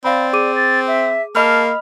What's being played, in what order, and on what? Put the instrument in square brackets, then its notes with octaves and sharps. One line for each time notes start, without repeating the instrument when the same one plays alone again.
[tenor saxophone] C4 [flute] D5 [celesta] F5 B5
[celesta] G#4 D6 D#7
[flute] A6
E5
[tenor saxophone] A#3 [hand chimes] D#5 B5 F6 [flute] A5